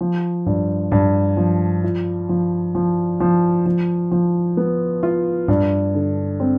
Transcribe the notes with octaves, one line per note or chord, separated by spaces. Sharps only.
F3
G2
G2
F3
F4
F3
F3
F3
F3
F3
B3
F4
G2
D3
C4